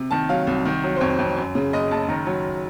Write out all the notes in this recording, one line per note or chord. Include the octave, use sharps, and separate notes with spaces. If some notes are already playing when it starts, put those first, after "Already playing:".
Already playing: C3
D#3 A5
F#3 F5
C2
D#3
F#3
C5
F2 C#5
F2
F#2
C#3
F#1 D#5
F#1 A5
D#3 A#5
F#3